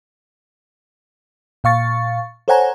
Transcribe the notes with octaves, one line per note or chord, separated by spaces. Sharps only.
A#2 F5 C#6 A6
A4 C5 C#5 F#5 G#5 A#5